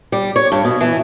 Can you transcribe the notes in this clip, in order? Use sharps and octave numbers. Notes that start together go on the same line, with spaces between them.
G3
C#5
G2
B2
E3